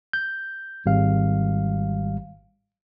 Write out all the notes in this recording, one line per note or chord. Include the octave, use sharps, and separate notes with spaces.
G6
G#1 G3 F5